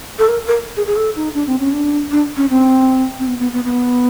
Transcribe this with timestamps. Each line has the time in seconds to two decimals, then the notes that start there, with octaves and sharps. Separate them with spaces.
0.19 A4
0.28 A#4
0.47 A#4
0.76 G#4
0.86 G#4
0.96 A4
1.16 D#4
1.34 D4
1.47 C4
1.60 C#4
1.72 D4
2.11 D4
2.36 C#4
2.49 C4
3.19 C4
3.27 B3
3.39 B3
3.53 B3
3.64 B3